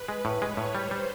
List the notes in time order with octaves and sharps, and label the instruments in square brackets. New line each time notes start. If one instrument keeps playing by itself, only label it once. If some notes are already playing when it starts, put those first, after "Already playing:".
Already playing: [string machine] B4
[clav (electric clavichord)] G#3
A2
[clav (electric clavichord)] G#3 [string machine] C#5
[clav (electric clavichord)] A2
[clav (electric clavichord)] G3 [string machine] C5
[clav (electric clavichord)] G3